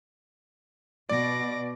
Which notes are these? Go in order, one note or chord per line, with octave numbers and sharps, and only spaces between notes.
B2 D5 D6 A#6